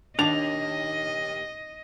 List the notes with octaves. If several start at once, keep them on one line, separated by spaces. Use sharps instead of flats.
D#2 D4 D#5 A5 F7